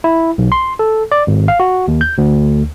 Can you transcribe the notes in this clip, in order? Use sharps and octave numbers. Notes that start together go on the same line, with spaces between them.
E4
B1
C6
A4
D5
G#1
F5
F#4
D#2
G6
D2